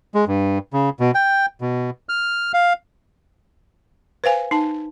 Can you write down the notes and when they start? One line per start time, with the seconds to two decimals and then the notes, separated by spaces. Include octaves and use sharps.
0.14 G#3
0.28 G2
0.73 C#3
1.00 B2
1.15 G5
1.61 B2
2.09 F6
2.54 F5
4.24 B4 C5 F5 G#5
4.51 D#4 A5